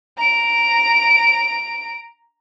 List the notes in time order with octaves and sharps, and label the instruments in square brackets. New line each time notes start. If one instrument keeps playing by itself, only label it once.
[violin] A#5 D7